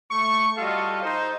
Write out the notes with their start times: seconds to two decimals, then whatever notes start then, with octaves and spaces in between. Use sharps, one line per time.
0.11 A3 C#6
0.58 G3 F4 F#4 A4 D#5 F5
1.03 D#4 C5